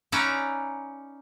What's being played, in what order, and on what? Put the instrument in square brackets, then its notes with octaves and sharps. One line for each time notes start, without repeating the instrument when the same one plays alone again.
[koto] C#4 D#4 B4 D5 E5 A#5